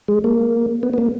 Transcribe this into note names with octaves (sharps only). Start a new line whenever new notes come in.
G#3
A#3
B3
B3
A#3